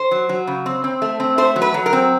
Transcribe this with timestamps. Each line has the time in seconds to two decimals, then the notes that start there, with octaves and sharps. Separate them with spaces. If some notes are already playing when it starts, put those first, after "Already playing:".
Already playing: C5
0.11 F#3
0.29 F#3
0.47 C#3
0.66 C4
0.84 C4
1.02 A3
1.20 C4
1.38 A3 C5
1.56 F#3
1.62 B4
1.74 F#3
1.86 A#4
1.93 C4